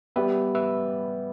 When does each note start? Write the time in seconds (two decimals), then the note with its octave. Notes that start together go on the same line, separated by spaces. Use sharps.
0.16 G3 B3 G4 B4 E5
0.55 B4 E5